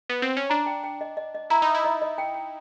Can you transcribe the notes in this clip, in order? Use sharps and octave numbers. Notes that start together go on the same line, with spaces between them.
B3
C4
C#4
D4 A#5
G5
G5
D#5
D#5
D#5
E4 A#5
D#4
A#5
E4
D#5
D#5
G5
G5